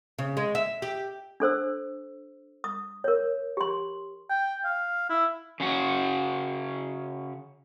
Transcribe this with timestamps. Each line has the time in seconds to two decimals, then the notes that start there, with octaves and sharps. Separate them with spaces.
0.18 C#3
0.37 G#3
0.55 E5
0.82 G4
1.40 D4 A4 C5 E6
2.64 D#6
3.04 A#4 C#5
3.57 G4 C6
4.30 G5
4.65 F5
5.09 E4
5.60 C#3 C#4 F#4